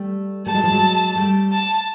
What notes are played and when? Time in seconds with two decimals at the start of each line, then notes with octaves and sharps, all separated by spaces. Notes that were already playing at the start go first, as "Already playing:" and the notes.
Already playing: G3 A3
0.46 G3 A3 A5
0.54 F#3 G#3
0.64 F3 G3
0.72 F#3 G#3
1.16 G3 A3
1.52 A5